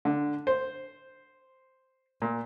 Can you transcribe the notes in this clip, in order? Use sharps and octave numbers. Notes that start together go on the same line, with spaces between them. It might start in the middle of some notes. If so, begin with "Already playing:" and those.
D3
C5
A#2